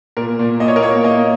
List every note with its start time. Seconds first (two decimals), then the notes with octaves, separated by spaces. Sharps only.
0.17 A#2 A#4
0.39 A#2
0.60 A#2 D#5
0.68 C#5
0.76 A#4
0.82 A#3 C#5
1.04 A#3 D#5